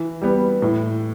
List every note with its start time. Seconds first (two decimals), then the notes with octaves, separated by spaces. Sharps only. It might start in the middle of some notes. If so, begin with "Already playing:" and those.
Already playing: E3
0.21 G3 B3
0.62 A2